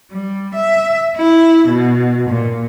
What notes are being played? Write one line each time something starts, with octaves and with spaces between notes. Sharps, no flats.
G3
E5
E4
B2
A#2